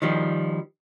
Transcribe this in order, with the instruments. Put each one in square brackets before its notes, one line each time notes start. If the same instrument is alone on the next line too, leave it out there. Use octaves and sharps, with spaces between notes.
[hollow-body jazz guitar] D#3 F3 G3